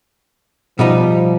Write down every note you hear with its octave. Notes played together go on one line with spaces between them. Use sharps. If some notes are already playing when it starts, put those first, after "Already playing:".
B2 F3 G3 D#4